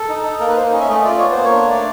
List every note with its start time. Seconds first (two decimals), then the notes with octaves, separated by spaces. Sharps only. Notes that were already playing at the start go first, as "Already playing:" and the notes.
Already playing: A4
0.09 D#4
0.25 D#4
0.40 A#3 A#4
0.48 B4
0.56 A#3 C5
0.73 C#4 D#5
0.81 E5
0.89 A3 D#5
1.05 F4 D5
1.18 B3 C#5
1.32 C5
1.37 A#3
1.44 C#5
1.53 D4
1.69 A3 D5